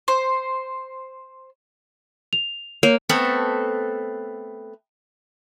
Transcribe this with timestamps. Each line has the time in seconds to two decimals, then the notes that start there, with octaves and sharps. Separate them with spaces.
0.08 C5
2.33 F7
2.83 A#3 C#5
3.09 A3 B3 C4 A4